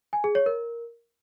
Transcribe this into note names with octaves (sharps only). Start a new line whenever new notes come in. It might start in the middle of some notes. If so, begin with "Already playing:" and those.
G#5
G#4
C#5
A#4